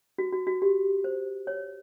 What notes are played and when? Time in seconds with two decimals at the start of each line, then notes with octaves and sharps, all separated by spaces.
0.18 F#4
0.32 F#4
0.47 F#4
0.62 G4
1.04 C5
1.47 C#5